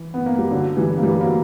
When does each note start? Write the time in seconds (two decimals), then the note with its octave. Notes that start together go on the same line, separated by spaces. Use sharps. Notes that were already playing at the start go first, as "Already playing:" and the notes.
Already playing: E3
0.14 B3
0.26 A#3
0.39 G3
0.50 D3 F#3
0.77 E3 G3
0.98 A#3
1.03 E3 G3
1.20 F#3 A#3